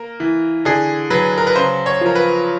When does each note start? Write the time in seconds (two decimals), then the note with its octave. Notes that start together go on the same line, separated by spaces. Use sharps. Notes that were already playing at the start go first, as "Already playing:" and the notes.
Already playing: A#3 A#4
0.20 E3
0.65 D3 G#4
1.10 F#3 B4
1.38 A#4
1.47 B4
1.56 C#3 C5
1.86 C#5
2.01 F3 A#4
2.15 B4